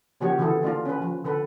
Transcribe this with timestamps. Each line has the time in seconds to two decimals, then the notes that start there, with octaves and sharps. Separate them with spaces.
0.21 C#3 F3 A#3 F#4 G4 C#5
0.39 D3 E3 E4 F#4 G#4 A4
0.63 A#3 D4 F4
0.85 C#4 B4
1.02 F3
1.25 D3 A4 B4